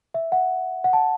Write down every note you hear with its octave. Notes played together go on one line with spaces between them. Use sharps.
E5
F#5
F#5
A5